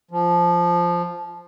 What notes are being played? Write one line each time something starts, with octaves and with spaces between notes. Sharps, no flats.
F3